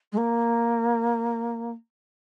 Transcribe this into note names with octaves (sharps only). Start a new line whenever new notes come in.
G#3
A#3